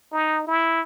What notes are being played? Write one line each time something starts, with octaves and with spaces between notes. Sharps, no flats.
D#4
E4